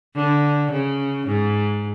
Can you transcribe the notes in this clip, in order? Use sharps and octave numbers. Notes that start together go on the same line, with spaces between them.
D3
C#3
G#2